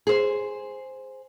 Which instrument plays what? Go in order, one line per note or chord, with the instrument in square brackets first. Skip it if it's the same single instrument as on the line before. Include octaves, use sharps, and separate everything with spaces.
[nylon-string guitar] G#4 C5